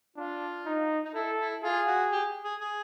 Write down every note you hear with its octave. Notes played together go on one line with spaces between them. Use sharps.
D4 F4
D#4
D#4
E4 A4
E4
F4 G#4
F#4
G4
G#4
G#4